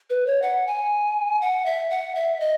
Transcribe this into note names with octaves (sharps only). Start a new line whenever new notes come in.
B4
C#5
F#5
G#5
F#5
E5
F#5
E5
D#5